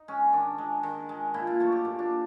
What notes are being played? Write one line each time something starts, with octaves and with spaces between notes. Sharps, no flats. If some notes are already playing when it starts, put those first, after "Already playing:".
Already playing: D#4
G#3 C#4
D#3 D4
G#3
D#3
G#3
A#2 E4
F4
F#3 A3 F#4
G4
A#2 F4
D4